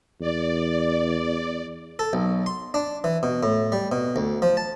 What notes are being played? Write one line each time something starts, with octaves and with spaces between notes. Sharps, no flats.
E2 D5
A4
B1
C6
D4
E3
B2
A2
G3
B2
D2
F3
A5